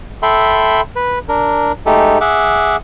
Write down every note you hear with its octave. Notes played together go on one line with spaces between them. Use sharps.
A4 E5 G5 B5 C6
B4
D4 A#4
G#3 A3 D#4 G4 A4
G#4 E5 F#5 D6